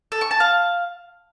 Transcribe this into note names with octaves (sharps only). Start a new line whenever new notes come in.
A4
C#6
A5
F5